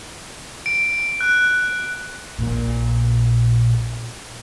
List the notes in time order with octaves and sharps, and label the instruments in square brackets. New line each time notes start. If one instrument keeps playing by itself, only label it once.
[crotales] D7
F#6
[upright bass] A#1 A#2